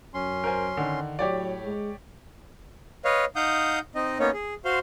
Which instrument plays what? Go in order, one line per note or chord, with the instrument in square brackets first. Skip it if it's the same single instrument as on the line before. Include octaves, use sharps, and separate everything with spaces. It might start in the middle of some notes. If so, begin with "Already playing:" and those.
[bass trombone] F#2 [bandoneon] C#4 C6
[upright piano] A#4 C5 G#5
D3 D#3
[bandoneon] A2 [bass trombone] F#3 [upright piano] G4 C#5 D5
[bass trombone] G#3
[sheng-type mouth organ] B4 C#5 D#5 F5
D#4 F5 F#5 D#6 G6
C4 D#4 D#5
A#3 B3 C#4 D#4 C#5
G#4
F#4 C5 F5 C6